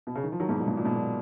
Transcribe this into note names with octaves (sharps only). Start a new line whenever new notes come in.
B2
C#3
D#3
F3
D#3 F#3
G#2 B2
A#2
G#2
A#2
G#2 B2
A#2